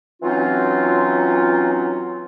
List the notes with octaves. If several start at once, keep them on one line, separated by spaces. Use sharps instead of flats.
E3 F#3 C4 C#4 D#4 F4